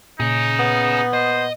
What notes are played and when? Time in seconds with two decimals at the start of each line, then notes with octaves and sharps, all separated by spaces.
0.20 A#2 C#4 D#4 G#4
0.59 B3
1.13 C5 D#5